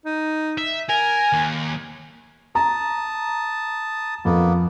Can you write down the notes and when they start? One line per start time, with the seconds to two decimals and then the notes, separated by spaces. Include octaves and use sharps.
0.06 D#4
0.58 E5
0.89 A#4 G#5
1.33 D#2
2.55 A5 A#5 D#6
4.25 F2 A#3 B3